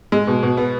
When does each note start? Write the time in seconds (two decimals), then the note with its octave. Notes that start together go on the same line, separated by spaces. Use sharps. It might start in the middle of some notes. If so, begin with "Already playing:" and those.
0.12 G#3
0.27 B2
0.43 B2
0.57 B3